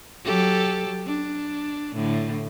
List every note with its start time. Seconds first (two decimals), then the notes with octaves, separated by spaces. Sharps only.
0.24 F#3 G4 A4
1.05 D4
1.95 A2 D3